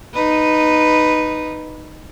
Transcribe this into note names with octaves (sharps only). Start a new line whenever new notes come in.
D#4 B4